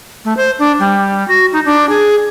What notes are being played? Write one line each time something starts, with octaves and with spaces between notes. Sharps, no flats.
A3
C5
D4
G3
F#4
D#4
D4
G#4